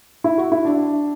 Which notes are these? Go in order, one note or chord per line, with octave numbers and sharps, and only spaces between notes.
E4
F#4
E4
D4